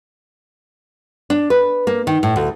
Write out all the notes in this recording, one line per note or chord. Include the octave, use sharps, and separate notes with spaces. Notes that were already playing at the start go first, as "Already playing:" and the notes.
D4
B4
A#3
D#3
A2
D2